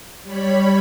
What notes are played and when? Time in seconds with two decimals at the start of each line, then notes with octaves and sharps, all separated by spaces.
0.23 G3 C#5 B5